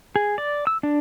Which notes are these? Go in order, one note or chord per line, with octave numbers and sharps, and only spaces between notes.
G#4
D5
E6
D4